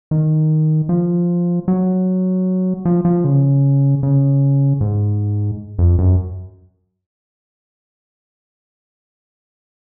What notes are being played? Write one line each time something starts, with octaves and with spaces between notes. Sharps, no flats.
D#3
F3
F#3
F3
F3
C#3
C#3
G#2
F2
F#2